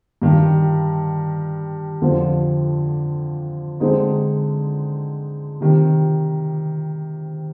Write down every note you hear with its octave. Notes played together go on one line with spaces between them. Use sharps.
G2 D#3 G3
F2 D3 F3
D3 G#3 C4 D#4
C3 D#3 G3